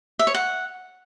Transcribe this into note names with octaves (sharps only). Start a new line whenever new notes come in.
E5
C#5
F#5